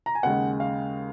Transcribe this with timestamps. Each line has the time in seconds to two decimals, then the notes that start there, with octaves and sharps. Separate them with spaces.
0.06 A#5
0.15 G#5
0.23 D#2 C#3 G#3 F#5
0.60 F5